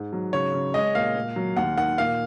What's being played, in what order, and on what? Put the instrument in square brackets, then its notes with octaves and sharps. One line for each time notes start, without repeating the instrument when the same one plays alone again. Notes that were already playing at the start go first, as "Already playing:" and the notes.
Already playing: [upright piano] G#2
F#3
[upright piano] C#3 [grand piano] C#5
[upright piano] C#3
[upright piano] G#3 [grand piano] D#5
[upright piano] A#2 [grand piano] F5
[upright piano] A#2
F#3
[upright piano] D#2 [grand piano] F#5
[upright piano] D#3 [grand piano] F#5
[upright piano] A#2 [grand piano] F5